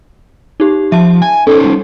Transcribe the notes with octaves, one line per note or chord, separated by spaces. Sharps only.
D#4 G4
F3 E5 A5
G#5
C#4 D#4 A4 C5
G3